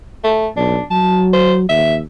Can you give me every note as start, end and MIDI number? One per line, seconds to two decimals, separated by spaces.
0.24 0.47 57
0.57 0.78 35
0.57 0.83 62
0.91 1.66 54
0.91 1.22 81
1.33 1.56 72
1.69 2.01 39
1.69 1.95 76